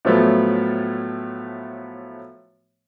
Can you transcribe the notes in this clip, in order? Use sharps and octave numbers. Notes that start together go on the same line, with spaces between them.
A2 F3 F#3 A3 B3